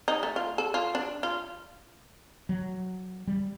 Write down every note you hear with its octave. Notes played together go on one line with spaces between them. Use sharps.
D#4
A3
F4
A4
F4
D4
F4
F#3
G3